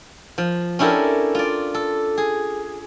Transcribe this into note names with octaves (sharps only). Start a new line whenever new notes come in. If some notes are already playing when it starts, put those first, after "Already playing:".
F3
C#4 D4 E4 G4 A4 A#4
F4 D5
A4
G#4